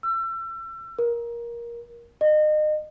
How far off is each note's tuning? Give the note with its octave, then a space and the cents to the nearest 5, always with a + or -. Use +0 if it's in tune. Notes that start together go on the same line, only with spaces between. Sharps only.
E6 +35
A#4 +15
D#5 -30